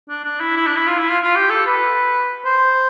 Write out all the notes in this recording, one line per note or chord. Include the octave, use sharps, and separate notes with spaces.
D4
D4
E4
E4
D4
E4
F4
E4
F4
F4
G4
A4
B4
C5